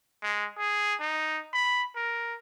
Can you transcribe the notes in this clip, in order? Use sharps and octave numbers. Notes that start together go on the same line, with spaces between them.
G#3
G#4
D#4
B5
A#4